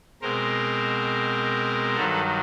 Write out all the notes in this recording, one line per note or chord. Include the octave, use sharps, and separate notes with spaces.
B2 G#3 C4 A#4 C5
G2 D#3 F#3 A4 B4